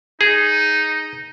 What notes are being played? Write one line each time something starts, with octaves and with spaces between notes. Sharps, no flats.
D#4 G#4